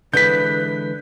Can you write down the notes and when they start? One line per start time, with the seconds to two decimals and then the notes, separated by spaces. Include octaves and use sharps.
0.13 D3 E3 G#3 B4 G6 B6